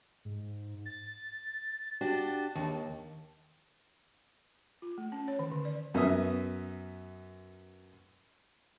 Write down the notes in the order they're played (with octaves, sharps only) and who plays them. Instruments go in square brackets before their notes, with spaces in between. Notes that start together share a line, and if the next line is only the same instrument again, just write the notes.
[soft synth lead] G#2
A6
[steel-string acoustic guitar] D4 F#4 G4
[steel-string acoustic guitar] D#2 [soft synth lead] D#3
[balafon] F4
A3
C#4
C#5
D#3
D3
D5
[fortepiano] F#2 B3 E5 D#6